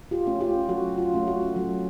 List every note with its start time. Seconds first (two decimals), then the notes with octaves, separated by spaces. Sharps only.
0.11 F4 G4
0.27 A3 C#4
0.41 F4 G4
0.69 F#3 F#4
0.98 F4
1.14 A3 C#4
1.28 F#4
1.56 F#3